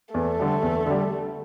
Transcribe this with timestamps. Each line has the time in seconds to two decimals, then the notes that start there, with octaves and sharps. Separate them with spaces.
0.14 E2 A3
0.40 D3 G3
0.63 E2
0.86 D3 G3